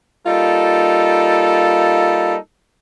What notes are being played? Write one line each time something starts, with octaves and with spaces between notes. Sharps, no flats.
G3 A#3 D#4 F4 A4